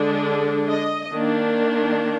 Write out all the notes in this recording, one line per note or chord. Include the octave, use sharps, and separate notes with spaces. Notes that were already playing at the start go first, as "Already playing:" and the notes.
Already playing: D3 G#3 D4
D#5
D#3 A#3 D4